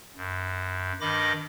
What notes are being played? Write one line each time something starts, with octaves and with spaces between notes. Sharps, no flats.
F#2
G2 D#3 D#5 B5 D6 A#6